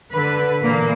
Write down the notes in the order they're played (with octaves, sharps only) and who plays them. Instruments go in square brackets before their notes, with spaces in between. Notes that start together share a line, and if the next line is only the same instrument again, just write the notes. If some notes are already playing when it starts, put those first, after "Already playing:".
[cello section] D3 B4
A#2 E3 A#3